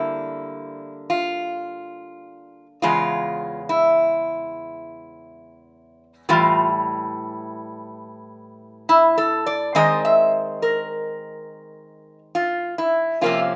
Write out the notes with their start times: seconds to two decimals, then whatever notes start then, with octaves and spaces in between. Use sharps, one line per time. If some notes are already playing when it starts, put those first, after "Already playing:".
Already playing: D3 G3 A#3 E4
1.10 F4
2.82 E2 C#3 G#3 F4
3.69 E4
6.29 A2 E3 G3 F4
8.89 E4
9.18 A4
9.46 D5
9.75 D#3 G#3 C4 D#5
10.05 E5
10.62 A#4
12.35 F4
12.78 E4
13.21 C3 F3 A#3 C#4 F4